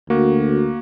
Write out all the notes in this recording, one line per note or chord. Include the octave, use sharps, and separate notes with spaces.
D2 A#3 F#4